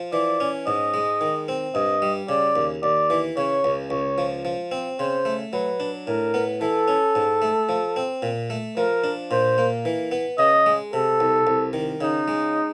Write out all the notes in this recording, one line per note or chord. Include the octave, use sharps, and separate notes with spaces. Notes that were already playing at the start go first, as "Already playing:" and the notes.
Already playing: F3
E3 D5
C#4
G#2 D#5
G#3
D#3
C4
G2 D#5
G3
C#3 D5
D#2
D#2 D5
E3
C#3 C#5
C#2
C#2 C#5
F3
F3
C4
C#3 C5
A3
F#3 B4
D4
A2 A#4
B3
E3 A4
C#4
G#2
A3
F3
C4
A#2
A3
F3 A#4
D4
A#2 C5
A#3
E3
B3
C#3 D#5
G#3
C3 A4
C2
C2
D#3
C#3 D#4
G#3